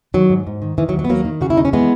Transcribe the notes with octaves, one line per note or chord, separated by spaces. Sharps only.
D#3 F#3
G#2
G#2
D#3
D#3 E3
F#3
D#2
F#3
B3
D#2 F#3 A#3
D#3
C#3 F#4
E4
D#2 D#4
C#4
E3 G#3 B3